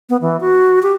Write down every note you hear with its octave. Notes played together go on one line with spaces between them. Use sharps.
B3
E3
F#4
G4